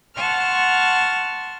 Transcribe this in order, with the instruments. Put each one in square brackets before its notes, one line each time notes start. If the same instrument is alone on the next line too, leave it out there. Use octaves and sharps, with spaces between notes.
[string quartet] F#5 A5 C6 C#6 F6